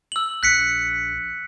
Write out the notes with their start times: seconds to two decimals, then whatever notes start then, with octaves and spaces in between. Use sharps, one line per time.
0.12 E6 F#7
0.43 A#1 F#6 B6 C#7